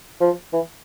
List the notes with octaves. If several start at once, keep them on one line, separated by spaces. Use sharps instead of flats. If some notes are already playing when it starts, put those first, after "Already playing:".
F3
E3